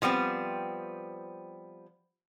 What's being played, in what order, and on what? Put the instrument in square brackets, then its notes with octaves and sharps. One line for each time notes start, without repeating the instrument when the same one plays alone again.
[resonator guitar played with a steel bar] F3 G3 B3 C4